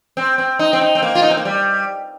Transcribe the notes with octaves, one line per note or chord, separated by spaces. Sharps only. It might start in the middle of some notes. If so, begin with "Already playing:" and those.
C4
C4
D#4
C4
D#4
C4
A#3
F4
D#4
C4
A#3
G3